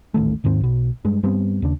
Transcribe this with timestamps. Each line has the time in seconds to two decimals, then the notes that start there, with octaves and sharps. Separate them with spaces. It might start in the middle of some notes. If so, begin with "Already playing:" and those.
0.14 D#1 A1 D#3 A3
0.44 D#2 G#2 D#3 C4
0.61 B1 B2
1.05 G2 G#3
1.23 G2 G3 B3 C4
1.62 D#2 C#3 D4